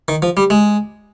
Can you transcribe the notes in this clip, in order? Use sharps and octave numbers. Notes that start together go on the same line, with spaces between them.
D#3
F3
G3
G#3